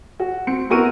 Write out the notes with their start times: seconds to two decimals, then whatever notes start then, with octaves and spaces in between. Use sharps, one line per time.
0.20 F#4
0.47 C4 C#7
0.70 B3 E4 F#4 A#4 C#6 D#7